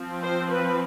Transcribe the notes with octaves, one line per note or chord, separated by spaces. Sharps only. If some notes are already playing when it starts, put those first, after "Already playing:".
Already playing: F3 C4
C5
B4